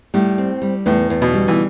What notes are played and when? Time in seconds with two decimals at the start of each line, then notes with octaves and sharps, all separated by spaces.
0.14 A2 G3
0.38 C4
0.62 G3
0.86 E2 A2
1.10 E2
1.22 B2
1.34 G3
1.48 E3